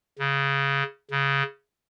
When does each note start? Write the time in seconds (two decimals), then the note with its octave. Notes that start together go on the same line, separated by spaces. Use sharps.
0.19 C#3
1.11 C#3